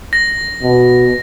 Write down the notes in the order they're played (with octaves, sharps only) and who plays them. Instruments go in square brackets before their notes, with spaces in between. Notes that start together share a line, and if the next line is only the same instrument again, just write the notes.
[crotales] A#6
[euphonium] B2